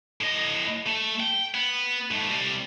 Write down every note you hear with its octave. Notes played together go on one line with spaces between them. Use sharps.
A2 D#5
A3
G5
B3
G#2 A3
C2 G3